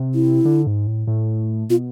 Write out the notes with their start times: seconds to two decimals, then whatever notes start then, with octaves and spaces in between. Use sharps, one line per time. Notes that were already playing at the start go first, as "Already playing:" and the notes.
Already playing: C3
0.14 E4
0.45 D3
0.67 G#2
0.87 A2
1.07 A2
1.70 B2 F4